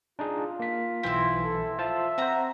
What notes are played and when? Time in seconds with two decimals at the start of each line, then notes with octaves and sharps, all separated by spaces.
0.19 D4 D#4 F4 G#4
0.60 A#3 B6
1.03 B1 E3 C4 E4 B6
1.43 A4
1.79 F4 C5 E5 A5
2.18 C4 F#4 C5 A#5